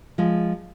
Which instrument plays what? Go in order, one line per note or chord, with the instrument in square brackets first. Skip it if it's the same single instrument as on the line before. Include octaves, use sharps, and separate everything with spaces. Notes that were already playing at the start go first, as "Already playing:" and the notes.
[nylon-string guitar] F3 G#3